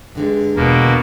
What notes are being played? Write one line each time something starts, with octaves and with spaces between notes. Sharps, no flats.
G2 D3 G#3
E1 B2 A#3